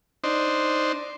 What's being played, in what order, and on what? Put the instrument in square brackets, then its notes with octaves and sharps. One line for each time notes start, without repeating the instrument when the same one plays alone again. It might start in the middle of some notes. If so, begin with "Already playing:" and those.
[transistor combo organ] D4 D#4 C5